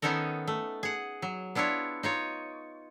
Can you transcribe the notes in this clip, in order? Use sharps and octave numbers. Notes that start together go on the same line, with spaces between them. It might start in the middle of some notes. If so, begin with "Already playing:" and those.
D#3 B3 C#4 D#4 A4 A#4
A3
G#4 F#5
F#3
B3 D4 E4 F4 C#5
D#4 F4 C#5